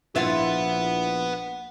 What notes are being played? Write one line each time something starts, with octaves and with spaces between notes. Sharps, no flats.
A#1 E4 F4 B4 F#5